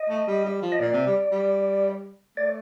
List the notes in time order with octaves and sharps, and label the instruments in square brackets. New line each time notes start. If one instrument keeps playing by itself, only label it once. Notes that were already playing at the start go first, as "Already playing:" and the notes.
Already playing: [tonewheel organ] D#5
[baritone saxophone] A3
G3
G3
F3
[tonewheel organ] D#5
[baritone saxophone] A#2 [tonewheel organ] D5
[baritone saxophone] C3
G3
G3
[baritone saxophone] A3 [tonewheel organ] D5